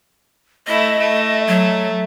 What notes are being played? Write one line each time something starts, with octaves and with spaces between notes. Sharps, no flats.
A3 E4 D#5
A3
F#3